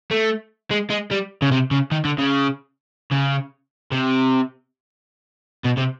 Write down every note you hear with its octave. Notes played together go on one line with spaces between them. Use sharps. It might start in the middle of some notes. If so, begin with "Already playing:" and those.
A3
G#3
G#3
G3
C#3
C3
C#3
D#3
D3
C#3
C#3
C3
B2
C3